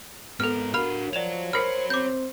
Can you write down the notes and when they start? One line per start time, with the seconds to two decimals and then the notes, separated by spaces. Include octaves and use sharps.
0.40 G#2 B3 A4 A#4 F6
0.74 D4 F#4 A#4 F5 B5 F6
1.13 F3 C#5 D5 F#5 E7 F7
1.53 A#4 C5 B5 F6 C7 C#7
1.90 C4 D6 G6